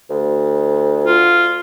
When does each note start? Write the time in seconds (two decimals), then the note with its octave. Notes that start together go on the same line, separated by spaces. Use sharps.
0.10 D2
1.04 F4